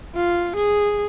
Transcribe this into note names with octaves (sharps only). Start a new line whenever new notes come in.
F4
G#4